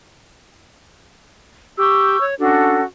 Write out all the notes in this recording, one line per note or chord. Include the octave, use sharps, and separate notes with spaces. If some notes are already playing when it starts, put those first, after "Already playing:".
G4 C#6 E6 G6
C#5
C#4 D4 F#4 A4